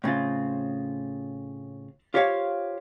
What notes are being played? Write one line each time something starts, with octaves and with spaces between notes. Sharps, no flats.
A2 C#3 C4 F4
F4 G4 C5 C#5 F5